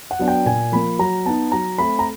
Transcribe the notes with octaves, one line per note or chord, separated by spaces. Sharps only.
F#5
F#3 B3 D4
G5
A#2 G#5
F3 A#3 B5
F#3 A#5
B3 D#4 A5
F#3 A#5
A3 C4 B5
A#5